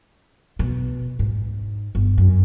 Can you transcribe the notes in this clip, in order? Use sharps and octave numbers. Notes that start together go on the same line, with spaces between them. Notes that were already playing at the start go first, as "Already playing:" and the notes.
B2
G#2
G1
F#2